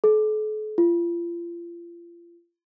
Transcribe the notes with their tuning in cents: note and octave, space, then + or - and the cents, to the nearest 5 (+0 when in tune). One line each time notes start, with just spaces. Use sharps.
A4 -45
F4 -35